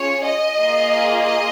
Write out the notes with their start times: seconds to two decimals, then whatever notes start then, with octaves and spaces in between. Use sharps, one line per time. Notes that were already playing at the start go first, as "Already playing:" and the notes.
Already playing: C#4 F4 G#4 C#5
0.25 D#5
0.57 A#3 F4 G#4
1.21 D#5